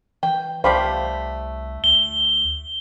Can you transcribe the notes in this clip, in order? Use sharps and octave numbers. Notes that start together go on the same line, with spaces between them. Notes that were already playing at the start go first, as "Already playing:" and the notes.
E3 G5
C2 A3 G4 C5 D5 F5 B5
D2 G7